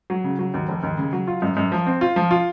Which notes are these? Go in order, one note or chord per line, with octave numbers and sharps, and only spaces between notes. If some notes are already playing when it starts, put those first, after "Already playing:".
F#3
C#3
F#3
D#2
F1
D#2
C#3
F#3
F4
F#2
F#2
F3
C4
F4
F3
F4